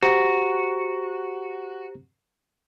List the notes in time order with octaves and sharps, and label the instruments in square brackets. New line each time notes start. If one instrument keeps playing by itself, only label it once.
[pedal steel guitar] F#4 [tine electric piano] G4 C5 A#5